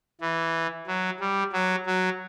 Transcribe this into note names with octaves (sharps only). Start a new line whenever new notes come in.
E3
F#3
G3
F#3
F#3